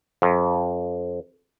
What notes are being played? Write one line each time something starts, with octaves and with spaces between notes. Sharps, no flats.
F2